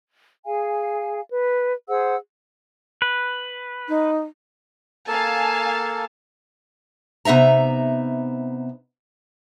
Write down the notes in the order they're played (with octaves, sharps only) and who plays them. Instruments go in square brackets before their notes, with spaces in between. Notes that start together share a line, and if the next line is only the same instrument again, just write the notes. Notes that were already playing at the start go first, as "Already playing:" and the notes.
[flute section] G#4 F5 G#5
B4
G#4 C5 F#5 E6
[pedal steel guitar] B4
[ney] D#4
[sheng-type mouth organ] A#3 A4 [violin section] F5 G#5 A5
[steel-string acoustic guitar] C3 B3 D#4 E5 A#5